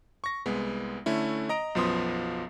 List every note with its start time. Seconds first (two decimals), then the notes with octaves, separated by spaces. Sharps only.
0.24 C#6 A#6
0.46 C2 G#3 B3
1.06 D3 A3 C#4 E4
1.49 D#5 A#5 D7
1.75 B1 F#2 F3 B3 C6 D#6